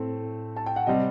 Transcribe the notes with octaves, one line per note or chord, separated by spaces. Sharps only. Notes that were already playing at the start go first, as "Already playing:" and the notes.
Already playing: A2 A3 C4
A5
G5
F#5
C3 G3 C4 D#5